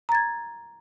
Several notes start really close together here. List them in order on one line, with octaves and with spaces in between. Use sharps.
A#5 A6 G#6